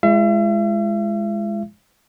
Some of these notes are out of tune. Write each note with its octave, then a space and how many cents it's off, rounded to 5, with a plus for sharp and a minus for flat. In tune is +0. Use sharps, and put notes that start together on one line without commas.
G#3 +0 E4 +45 E5 +45